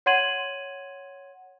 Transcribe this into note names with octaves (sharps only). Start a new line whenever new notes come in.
C#5 F#5 C6 G#6 D#7 F#7